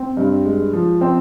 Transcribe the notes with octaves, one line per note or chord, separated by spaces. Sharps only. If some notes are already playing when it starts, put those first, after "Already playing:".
Already playing: C4
G2
G#3
F3
C4